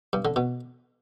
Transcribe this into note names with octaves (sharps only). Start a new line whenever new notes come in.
G2
D3
B2